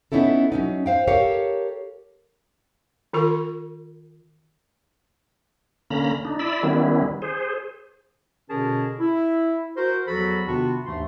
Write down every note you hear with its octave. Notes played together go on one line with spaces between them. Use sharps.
B3 C#4 D#4 E4 A4
F#3 C#4 D#4
C5 F5 G5
G4 A4 A#4 C#5 F5 G5
D#3 F4 A#4 C#6
D3 A#3 C#4 A#5 B5
D4 D#4
E4 D5 B5 E6
D#3 G3 B3 C#4 E4
G#4 C5
B2 D3 C#4 G#4 A#4 A5
E4
F#4 A#4 C5
E2 F3 F#3 F#4 A4 B5
C3 D#3 B3 D4 F4 F#4
D#2 G#2 E3 A3 D4 C6